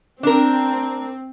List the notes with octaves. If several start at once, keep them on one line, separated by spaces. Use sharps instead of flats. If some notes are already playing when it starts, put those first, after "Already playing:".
C4 D4 A#4